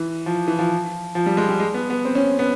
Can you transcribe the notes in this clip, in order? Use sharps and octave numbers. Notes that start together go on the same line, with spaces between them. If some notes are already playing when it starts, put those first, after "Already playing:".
Already playing: E3
F3
E3
F3
F3
G3
G#3
G3
G#3
B3
B3
C4
C#4
B3